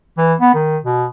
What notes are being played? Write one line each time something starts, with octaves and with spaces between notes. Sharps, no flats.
E3
B3
D#3
B2